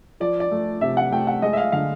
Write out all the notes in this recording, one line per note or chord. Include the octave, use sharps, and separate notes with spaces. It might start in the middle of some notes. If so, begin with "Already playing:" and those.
F3 D5
D5
A3
C3 E5
F#5
A3 G5
F#5
G#3 D#5
E5
F5
D3 F5